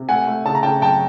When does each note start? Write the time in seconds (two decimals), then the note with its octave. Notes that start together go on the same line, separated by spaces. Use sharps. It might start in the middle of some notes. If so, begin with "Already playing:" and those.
Already playing: C3
0.09 A3 F#5 G#5
0.27 A3
0.45 C#3 A5
0.55 A#5
0.63 C#3 G5 A5
0.82 F#2 G5 A5